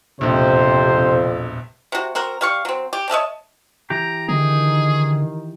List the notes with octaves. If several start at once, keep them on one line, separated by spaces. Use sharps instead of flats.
E1 A#1 F2 C3 C5
C3 F#4
C4 F#4 A#4
G3 F5 C#6
F#3 C4
G4
C#5 D#5 E5 A5
E3 G4 A#5
D3 D#3 G#4